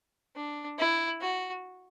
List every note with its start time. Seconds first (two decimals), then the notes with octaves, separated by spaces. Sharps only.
0.36 D4
0.79 E4
1.21 F#4